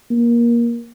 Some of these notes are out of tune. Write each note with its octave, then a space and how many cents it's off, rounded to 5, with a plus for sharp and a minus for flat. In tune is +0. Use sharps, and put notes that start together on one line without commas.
A#3 +20